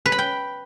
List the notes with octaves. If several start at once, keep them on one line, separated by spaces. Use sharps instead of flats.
B4
B5
G5